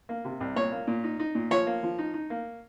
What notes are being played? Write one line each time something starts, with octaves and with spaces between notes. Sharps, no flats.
A#3
C3
C2
A#2 C#5
A#3
A#2
D#4
D#4
A#2
F3 C#5
A#3
F3
D#4
D#4
A#3